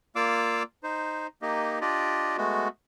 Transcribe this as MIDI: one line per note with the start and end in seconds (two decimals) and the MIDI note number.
0.16 0.63 58
0.16 0.63 65
0.16 0.63 74
0.16 0.63 77
0.16 0.63 86
0.16 0.63 88
0.83 1.27 63
0.83 1.27 72
1.42 1.79 58
1.42 1.79 63
1.42 1.79 67
1.42 1.79 75
1.81 2.36 62
1.81 2.36 65
1.81 2.36 67
1.81 2.36 74
1.81 2.36 75
2.38 2.68 56
2.38 2.68 57
2.38 2.68 59
2.38 2.68 66